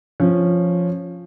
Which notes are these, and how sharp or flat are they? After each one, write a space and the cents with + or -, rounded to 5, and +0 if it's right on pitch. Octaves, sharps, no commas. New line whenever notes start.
F3 +0 C#4 -10